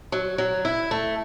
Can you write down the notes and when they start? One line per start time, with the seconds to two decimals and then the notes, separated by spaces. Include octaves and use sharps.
0.12 F#3
0.38 F#3
0.65 E4
0.91 A3